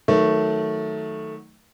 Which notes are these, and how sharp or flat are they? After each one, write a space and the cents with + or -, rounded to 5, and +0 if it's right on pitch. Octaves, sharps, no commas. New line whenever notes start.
D#3 +15 F#3 +0 A3 +0